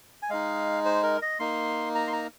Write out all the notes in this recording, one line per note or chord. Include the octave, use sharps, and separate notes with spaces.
G#5
G#3 D#4 F5
C5
A#4
D#5
A#3 D#4 C6
A#5
C6
A#5